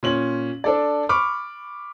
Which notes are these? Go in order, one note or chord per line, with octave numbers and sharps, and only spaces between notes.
A#2 C#4 F#7
D4 A4 D5
B5 C#6 D6 F6